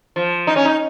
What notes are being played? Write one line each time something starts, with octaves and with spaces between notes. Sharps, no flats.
F3
D#4
C#4
D#4